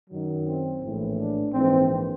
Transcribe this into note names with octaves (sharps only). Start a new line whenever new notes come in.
F#2 D#3 F#3
C4
A#1 A2 E3
D4
A#1 G#2 E3 C4